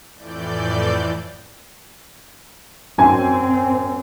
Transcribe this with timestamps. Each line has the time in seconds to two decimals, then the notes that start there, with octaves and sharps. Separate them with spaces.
0.15 F2 A2 E3 D5 G6
2.98 F#2 C4 G#5